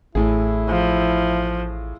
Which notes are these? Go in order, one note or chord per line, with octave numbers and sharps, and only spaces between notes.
A1 A2 E4 G#4
F3